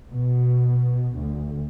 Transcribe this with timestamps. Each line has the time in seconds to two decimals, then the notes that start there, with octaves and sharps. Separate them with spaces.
0.10 B2
1.19 D2